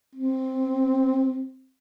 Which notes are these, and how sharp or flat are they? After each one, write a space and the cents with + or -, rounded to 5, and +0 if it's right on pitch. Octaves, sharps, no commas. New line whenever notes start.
C4 +0